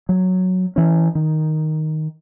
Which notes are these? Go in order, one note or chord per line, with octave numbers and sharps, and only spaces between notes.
F#3
E3 C#4
D#3